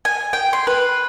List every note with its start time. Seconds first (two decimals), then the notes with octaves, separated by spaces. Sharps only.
0.05 G#5
0.33 G5
0.53 C6
0.67 B4